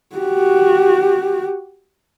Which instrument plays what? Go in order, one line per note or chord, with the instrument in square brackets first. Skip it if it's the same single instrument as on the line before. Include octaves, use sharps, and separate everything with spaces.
[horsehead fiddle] F#4 G4